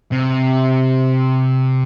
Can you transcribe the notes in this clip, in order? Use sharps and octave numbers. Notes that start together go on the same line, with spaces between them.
C3